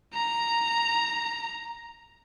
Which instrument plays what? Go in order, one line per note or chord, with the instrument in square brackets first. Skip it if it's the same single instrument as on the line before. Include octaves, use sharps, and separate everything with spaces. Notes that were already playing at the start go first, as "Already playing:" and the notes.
[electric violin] A#5